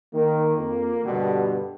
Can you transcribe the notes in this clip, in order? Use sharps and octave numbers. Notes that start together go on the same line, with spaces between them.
D#3 A#3
F2
G2 B2 D3 G3